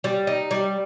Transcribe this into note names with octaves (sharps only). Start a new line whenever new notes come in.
G3
D#4
G3